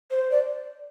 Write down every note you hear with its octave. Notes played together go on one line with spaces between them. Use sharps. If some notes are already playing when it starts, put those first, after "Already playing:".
C5
D5